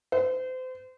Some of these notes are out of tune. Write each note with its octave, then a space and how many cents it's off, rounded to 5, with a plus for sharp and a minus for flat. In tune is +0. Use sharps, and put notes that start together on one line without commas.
C5 -35